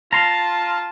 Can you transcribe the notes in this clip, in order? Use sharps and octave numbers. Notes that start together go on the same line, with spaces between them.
F4 A5 A#5 C6